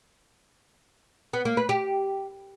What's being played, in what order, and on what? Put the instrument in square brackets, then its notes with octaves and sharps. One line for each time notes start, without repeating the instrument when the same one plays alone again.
[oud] B3
A#3
B4
G4